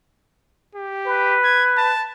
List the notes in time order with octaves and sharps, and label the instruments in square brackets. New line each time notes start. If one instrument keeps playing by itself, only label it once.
[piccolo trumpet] G4
[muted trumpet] B4
[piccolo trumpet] G#6
A5